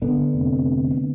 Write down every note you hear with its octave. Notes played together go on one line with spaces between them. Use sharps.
D3 B3
F1
D3
D3